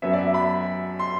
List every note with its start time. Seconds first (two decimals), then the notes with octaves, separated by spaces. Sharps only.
0.02 F#2 F#3 B3 E5
0.13 D5
0.18 E5
0.34 B5
0.99 C6